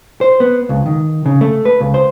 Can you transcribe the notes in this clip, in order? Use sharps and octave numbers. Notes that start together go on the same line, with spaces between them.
C5
B3
C#2
D#3
C#3
A3
B4
C#2
C5